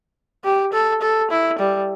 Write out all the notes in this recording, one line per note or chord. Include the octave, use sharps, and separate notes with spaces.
G4
A4
A4
E4
G3